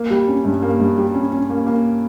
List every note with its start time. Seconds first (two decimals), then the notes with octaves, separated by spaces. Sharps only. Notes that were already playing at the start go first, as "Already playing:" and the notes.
Already playing: A#3
0.10 G3
0.28 C#4
0.45 G2
0.62 A#3
0.80 G2
0.98 G3
1.14 C#4
1.32 C#4
1.50 A#3
1.67 A#3